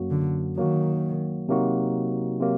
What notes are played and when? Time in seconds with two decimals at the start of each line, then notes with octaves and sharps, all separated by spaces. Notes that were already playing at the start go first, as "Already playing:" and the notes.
Already playing: F#2 F#3 A#3 F#4
0.10 D3
0.57 D#3 F#3 A#3 F#4
1.49 C3 F#3 A#3 D#4 F#4
2.41 C3 F#3 A#3